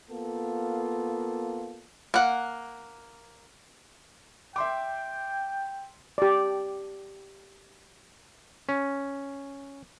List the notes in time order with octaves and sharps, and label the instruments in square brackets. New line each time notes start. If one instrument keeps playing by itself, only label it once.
[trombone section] A#3 B3 F4 A4
[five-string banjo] A#3 F#5
[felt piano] E5 C6 D6 [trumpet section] G5
[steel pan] G4 D5
[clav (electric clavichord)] C#4